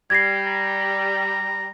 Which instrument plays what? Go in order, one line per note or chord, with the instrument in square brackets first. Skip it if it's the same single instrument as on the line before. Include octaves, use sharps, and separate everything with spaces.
[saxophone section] G3 [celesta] G#6 A#6 C7
[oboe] A#5